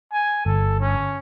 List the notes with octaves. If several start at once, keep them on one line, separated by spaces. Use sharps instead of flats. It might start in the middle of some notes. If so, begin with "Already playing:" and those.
G#5
G1 A4
C#4